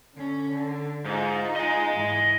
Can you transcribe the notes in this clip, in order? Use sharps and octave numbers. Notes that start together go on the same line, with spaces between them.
D3 C#4
D3
G#2 D#4 F4
D#5 G#5
G#2 E3